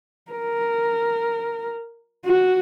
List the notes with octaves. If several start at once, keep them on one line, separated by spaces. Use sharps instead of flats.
A#4
F#4